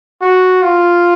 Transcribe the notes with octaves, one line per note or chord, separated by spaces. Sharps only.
F#4
F4